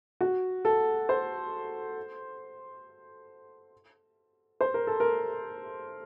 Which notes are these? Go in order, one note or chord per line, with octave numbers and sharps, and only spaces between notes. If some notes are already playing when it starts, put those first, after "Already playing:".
F#4
A4
C5
C5
A#4
A4
A#4